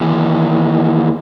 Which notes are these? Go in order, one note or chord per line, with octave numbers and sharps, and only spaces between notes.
D#2 E3